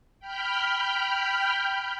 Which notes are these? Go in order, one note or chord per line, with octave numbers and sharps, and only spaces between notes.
G5 B5 F6 G6